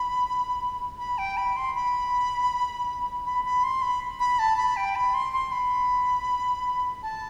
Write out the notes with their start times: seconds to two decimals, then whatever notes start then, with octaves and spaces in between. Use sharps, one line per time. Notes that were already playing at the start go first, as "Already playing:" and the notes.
Already playing: B5
0.99 B5
1.18 G5
1.37 B5
1.57 C6
1.75 B5
3.25 B5
3.45 B5
3.64 C6
3.82 B5
4.19 B5
4.39 A5
4.57 B5
4.76 G5
4.95 B5
5.14 C6
5.33 C6
5.52 B5
7.03 A5